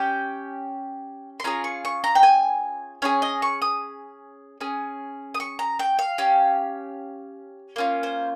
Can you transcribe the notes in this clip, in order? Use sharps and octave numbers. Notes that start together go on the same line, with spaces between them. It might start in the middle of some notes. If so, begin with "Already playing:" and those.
Already playing: C#4 G4 G5
C6
C#4 F4 G#4 A#5
C#6
C#6
A#5
G5
G#5
C#4 F4 G#4 C#5
D#5
C#6
D#6
C#4 G#4
D#6
C#6
A#5
G5
F5
C#4 G4
A#3 C#4 F4
C5